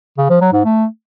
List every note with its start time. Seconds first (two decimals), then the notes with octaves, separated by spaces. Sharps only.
0.18 C#3
0.30 F3
0.41 F#3
0.53 G#2
0.65 A3